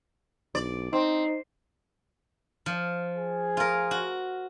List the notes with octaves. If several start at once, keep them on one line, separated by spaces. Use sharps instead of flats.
B1 D5
C4 D#4
F3
G#4
F4 A#4
F#4